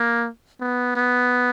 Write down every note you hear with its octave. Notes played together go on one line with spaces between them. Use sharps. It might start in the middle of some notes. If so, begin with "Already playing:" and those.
Already playing: A#3
B3
B3